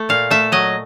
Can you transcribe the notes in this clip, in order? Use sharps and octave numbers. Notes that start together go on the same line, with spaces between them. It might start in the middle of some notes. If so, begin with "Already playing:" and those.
Already playing: A3
A#2 F5
A3 E5
F#3 D#5